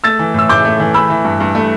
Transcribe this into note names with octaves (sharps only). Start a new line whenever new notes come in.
A3 E6 A6
E3
A2 E6
A2 D6 G6
A3
E3
A3 B5 E6
E3
G2
G2
A3